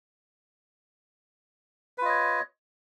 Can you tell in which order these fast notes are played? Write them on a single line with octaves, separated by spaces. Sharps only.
B4 F4 D#5 C#5